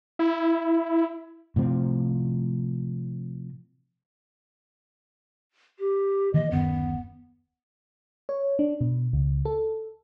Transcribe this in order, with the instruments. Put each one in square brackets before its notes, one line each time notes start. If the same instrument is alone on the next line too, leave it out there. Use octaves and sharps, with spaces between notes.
[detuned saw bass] E4
[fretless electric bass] A2 C3 F3 C4
[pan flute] G4
[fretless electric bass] D#3 E3 A#3 [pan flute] D#5
[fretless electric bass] D1 F#2 D#3 [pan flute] B3
[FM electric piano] C#5
D4
B2
C#2
A4